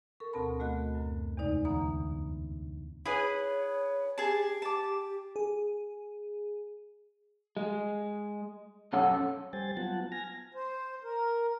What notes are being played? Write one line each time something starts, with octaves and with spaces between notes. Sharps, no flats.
A4 A#4 C#6
D2 B2 C4 A#4 A5 B5
D2 A3 B3 F#4 D#5 F#6
F#2
E2 C3 G#3 D#4 D5
D2 D3 E3 B3 A#5 D#6
E4 G#4 B4 C#5
G4 G#4 A5
A5 D6
G#4
G#3
B1 F#2 C#4 A4 F#5
G3 C5 G5 G#5 A6
F#3 B3 F4 F#5 A5
G#5 F6 A#6
C5
A#4